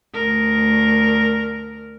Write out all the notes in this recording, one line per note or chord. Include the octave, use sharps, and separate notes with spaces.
D2 A#4